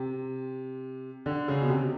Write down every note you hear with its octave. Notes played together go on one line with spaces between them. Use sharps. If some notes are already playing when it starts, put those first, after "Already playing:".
Already playing: C3
D3
C#3
B2
C3